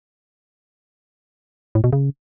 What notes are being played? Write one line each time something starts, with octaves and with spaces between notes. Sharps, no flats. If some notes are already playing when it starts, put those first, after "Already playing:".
A2
B2
C#3